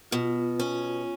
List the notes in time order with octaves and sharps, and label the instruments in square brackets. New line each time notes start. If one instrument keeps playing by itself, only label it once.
[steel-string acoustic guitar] B2 [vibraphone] F4
[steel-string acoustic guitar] C#4